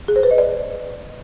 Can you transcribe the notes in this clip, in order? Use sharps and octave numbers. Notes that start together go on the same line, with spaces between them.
G#4
C5
B4
D#5
D5